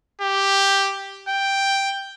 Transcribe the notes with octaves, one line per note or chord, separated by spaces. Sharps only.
G4
G5